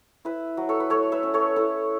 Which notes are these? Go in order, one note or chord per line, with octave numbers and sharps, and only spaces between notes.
E4 B4 E5
F#3
A4 C#5
B4
A3 A4 C#5
B4 E5
C#4
A4 C#5
E4 A4